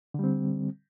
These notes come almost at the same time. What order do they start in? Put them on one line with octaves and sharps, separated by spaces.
D3 G3 C4